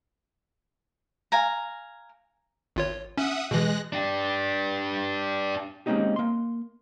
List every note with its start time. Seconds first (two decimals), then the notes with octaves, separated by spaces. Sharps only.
1.32 F5 G#5 A#5
2.76 G#1 F4 C#5
3.18 C#4 E5 F#5 D#6
3.51 B2 E3 G#3 F#6 A#6
3.93 D4 G4
5.86 G#3 A#3 C4 C#4 D#4 G4
6.16 A#3 C6